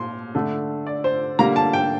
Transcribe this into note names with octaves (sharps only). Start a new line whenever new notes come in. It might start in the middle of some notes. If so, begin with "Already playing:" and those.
Already playing: A#2 C6
D3 A3 D4
D5
C5
D3 G3 A#3 A#5
A5
G5